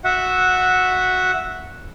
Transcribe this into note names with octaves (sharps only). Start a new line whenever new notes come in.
F#4 E5 F#5